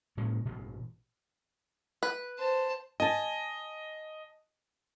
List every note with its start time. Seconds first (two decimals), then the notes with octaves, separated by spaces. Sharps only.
0.17 A2 G#3 A#3 C#4
0.45 A1 G2 B2
2.03 B4
2.39 C5 A5
3.00 D#5 G#5 A5